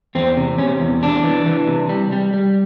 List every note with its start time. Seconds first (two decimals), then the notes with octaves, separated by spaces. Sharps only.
0.15 E2 C4
0.37 C3
0.58 C3 C#4
0.80 E2
1.02 C3 D4
1.24 E3
1.46 E3
1.68 C3
1.89 G3
2.12 G3
2.34 G3